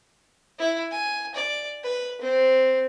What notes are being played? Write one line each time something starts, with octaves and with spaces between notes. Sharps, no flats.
E4
G#5
D5
B4
C4